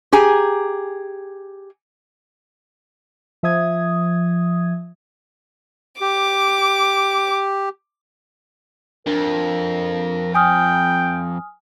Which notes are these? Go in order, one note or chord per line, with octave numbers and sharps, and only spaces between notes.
G4 G#4 G#5 A#5
F3 E5 D#6 G#6
G4 D6
F2 D4 A#4
G5 G#5 D#6 F6